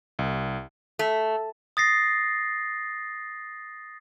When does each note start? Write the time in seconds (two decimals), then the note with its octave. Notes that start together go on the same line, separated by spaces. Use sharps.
0.19 C2
0.99 A3
1.77 D#6 A6 A#6 C7